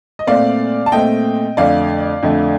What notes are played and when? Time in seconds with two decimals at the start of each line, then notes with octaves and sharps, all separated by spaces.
0.19 D#5
0.27 A#2 A3 C4 D5 F5
0.86 A5
0.92 A#2 A3 C4 D#5 G5
1.57 F2 D3 A3 D5 F5
2.23 F2 D3 A3